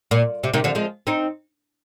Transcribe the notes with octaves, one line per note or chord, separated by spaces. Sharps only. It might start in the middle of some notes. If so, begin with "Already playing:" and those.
A#2
C3
C3 D#3
D3 F3
F3 G#3
C4 D#4